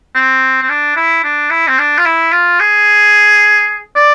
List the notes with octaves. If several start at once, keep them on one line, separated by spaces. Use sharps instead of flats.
C4
C4
D4
E4
D4
E4
C4
D4
F4
E4
F4
G#4
D5